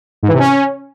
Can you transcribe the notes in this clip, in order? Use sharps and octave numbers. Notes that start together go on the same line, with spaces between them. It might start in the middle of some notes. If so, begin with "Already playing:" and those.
G#2
E3
C3
C#4